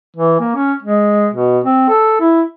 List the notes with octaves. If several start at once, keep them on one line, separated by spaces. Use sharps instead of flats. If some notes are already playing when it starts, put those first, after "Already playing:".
E3
A#3
C#4
G#3
B2
C4
A4
E4